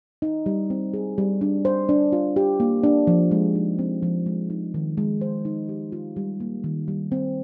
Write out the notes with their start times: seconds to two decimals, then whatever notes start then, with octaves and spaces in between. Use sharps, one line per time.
0.22 D#4
0.46 G3
0.70 C4
0.94 G#4
1.18 G3
1.41 D4
1.65 C5
1.89 D4
2.12 F4
2.36 G4
2.60 A#3
2.83 D4
3.07 F3
3.31 G#3
3.55 D#4
3.79 C4
4.02 F3
4.26 G#3
4.50 D#4
4.74 D#3
4.97 G#3
5.21 C5
5.45 D#4
5.69 G4
5.92 F4
6.17 G3
6.40 A#3
6.64 D#3
6.88 G3
7.12 C4